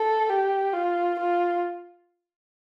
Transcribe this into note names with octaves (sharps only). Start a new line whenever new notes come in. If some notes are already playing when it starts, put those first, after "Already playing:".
Already playing: A4
G4
F4
F4